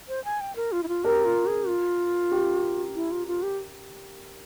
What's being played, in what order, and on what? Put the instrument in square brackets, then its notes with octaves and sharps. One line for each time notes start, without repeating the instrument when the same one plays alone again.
[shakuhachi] C5
G#5
G5
A#4
F4
E4
F4
[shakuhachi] G4 [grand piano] A#4
[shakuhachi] F4
G#4
F4
[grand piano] G4
[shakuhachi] E4
F4
F4
G4